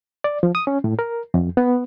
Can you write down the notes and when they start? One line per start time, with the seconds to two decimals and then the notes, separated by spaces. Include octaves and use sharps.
0.24 D5
0.43 F3
0.55 D#6
0.67 C#4
0.84 A2
0.99 A#4
1.34 F2
1.57 B3